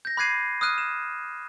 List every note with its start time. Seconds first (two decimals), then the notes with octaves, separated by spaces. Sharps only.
0.05 G6 A#6
0.17 B5 D6 F#6 G#6 C7 D#7
0.61 D#6 F6 F#6 D#7
0.78 E7